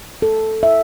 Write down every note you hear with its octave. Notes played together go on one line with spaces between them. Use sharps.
A4
E5